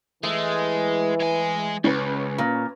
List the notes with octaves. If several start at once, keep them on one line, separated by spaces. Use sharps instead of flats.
E3 G#3 A3
G#3 G#5
C#2 C#4 B4
A#2